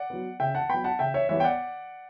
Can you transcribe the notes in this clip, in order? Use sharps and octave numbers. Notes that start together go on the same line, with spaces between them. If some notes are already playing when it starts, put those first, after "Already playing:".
Already playing: D5 F#5
F#3 B3
C#3 E5 G5
F#5 A5
F#3 B3 G5 B5
F#5 A5
C#3 E5 G5
C#5 E5
E3 G3 B3 C#5 E5
G5
D5 F#5